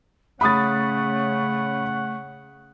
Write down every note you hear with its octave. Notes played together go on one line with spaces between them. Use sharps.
C#3 A3 C#4 F#5 B5 D#6 A6